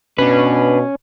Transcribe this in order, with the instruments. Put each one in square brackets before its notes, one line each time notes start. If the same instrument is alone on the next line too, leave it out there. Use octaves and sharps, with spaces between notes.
[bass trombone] B2 [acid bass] C#4 [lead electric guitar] D4 B4